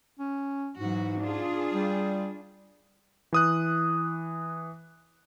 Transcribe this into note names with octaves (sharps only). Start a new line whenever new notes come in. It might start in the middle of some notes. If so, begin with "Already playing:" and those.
C#4
G#2 E3 F#3 F#4
D4 F4 G#4
G3
E3 D#6 F#6